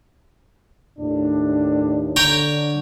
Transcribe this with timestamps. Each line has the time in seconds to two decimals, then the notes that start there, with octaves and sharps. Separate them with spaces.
0.99 D#2 A2 D4
2.16 D3 C#5 G5 A#5